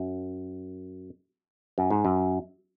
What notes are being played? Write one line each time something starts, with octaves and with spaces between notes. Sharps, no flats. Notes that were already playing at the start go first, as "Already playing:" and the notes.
Already playing: F#2
F#2
G#2
F#2